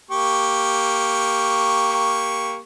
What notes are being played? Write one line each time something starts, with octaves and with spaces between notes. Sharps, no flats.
A#3 G4 C#6